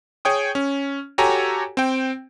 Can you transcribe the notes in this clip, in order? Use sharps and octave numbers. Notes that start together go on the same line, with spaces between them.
G#4 C#5 G5 D#6
C#4
F#4 G4 A4 C#5 G#5 A#5
C4 G5